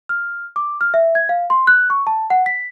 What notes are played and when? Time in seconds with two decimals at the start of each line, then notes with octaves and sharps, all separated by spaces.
0.09 F6
0.56 D6
0.81 F6
0.94 E5
1.15 G#6
1.29 F5
1.50 C6
1.67 F#6
1.90 C#6
2.07 A5
2.30 F#5
2.46 B6